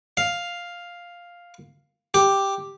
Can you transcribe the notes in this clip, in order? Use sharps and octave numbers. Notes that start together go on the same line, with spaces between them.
F5
G4